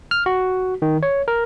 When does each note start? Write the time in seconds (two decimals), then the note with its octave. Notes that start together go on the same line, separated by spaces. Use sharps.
0.11 F6
0.26 F#4
0.82 D#3
1.03 C#5
1.28 A#4